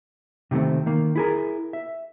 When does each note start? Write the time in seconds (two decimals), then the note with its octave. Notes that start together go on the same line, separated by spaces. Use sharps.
0.51 C3 D#3 G3 A3 C4
0.86 D#3 A#3
1.16 E4 G#4 A#4
1.73 E5